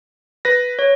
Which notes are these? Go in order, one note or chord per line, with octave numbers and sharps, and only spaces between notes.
B4 A#6
C#5